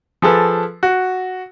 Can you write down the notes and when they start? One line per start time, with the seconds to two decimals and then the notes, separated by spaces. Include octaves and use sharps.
0.22 F3 G#4 A4 B4
0.83 F#4